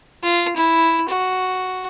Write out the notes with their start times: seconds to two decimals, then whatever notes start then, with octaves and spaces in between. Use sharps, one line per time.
0.23 F4
0.56 E4
1.09 F#4